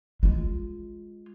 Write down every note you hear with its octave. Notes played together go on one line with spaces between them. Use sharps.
G#3 F4